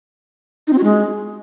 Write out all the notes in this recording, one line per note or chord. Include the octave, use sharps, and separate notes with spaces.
D#4
C4
F#4
G#3